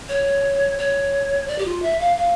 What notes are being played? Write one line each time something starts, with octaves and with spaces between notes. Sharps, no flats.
C#5
C#5
D5
G4
F4
E5
F5
F5